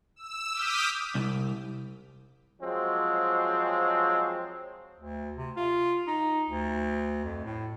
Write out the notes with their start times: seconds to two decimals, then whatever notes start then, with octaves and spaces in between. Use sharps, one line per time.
0.16 E6
0.52 D6 D#6 F6 G6 B6
1.15 C2
2.62 F3 F#3 G#3 C4
5.00 D2
5.37 C3
5.56 F4
6.07 D#4
6.49 D2
7.25 F2
7.44 A2